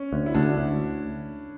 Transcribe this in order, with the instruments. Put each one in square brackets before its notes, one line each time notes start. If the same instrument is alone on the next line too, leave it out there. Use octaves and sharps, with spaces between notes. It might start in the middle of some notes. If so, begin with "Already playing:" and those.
Already playing: [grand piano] C#4
[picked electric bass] D2
[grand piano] E4
[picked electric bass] D2 [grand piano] D4
[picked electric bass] D2